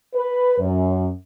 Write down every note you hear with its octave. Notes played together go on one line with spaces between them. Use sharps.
B4
F#2